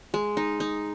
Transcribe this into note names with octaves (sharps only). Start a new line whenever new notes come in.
G#3
D#4
D#4